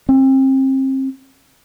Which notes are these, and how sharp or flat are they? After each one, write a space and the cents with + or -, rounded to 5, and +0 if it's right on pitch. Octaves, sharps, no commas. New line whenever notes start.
C4 +35